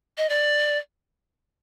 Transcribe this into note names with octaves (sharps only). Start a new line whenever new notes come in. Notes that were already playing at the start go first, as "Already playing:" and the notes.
D#5
D5